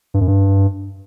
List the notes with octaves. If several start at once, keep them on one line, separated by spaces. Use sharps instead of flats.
G2
F#2
G2